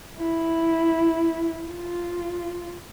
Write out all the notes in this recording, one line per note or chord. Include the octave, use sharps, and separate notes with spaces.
E4
F4